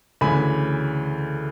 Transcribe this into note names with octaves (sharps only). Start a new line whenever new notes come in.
D2 C#3 E3 G#5 B5